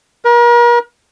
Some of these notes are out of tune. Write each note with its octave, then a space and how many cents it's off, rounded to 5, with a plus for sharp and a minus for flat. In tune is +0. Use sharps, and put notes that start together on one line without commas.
A#4 +40